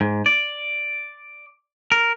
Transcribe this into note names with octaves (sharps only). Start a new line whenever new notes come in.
G#2
D5
A#4